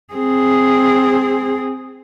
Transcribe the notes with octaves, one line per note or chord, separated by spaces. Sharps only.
C4 G#4